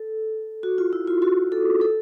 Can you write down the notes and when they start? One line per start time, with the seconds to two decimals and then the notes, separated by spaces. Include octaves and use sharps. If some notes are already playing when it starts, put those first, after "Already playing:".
Already playing: A4
0.63 F#4
0.78 F4
0.93 E4
1.07 F4
1.22 F#4
1.52 A4
1.81 A4